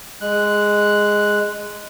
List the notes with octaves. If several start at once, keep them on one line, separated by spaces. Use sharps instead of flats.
G#3 F#6